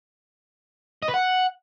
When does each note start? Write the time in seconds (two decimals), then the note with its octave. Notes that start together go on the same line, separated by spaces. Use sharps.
1.03 D#5
1.08 B4
1.14 F#5